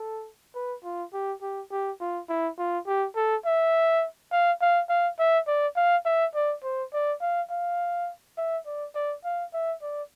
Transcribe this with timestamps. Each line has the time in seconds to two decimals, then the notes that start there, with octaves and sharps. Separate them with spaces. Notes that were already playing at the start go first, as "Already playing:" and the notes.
Already playing: A4
0.55 B4
0.84 F4
1.13 G4
1.42 G4
1.71 G4
2.01 F4
2.29 E4
2.58 F4
2.87 G4
3.16 A4
3.45 E5
4.32 F5
4.61 F5
4.89 F5
5.19 E5
5.47 D5
5.77 F5
6.05 E5
6.35 D5
6.64 C5
6.93 D5
7.21 F5
7.50 F5
8.38 E5
8.66 D5
8.95 D5
9.24 F5
9.54 E5
9.82 D5